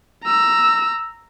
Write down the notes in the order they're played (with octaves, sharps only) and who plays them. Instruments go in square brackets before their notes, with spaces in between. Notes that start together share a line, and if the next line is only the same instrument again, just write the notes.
[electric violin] A#5 E6